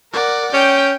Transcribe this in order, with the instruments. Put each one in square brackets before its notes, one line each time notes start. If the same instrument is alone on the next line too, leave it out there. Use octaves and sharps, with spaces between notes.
[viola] A#4 [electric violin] D5 F#5
[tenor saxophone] C#4 [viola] G5 [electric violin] G6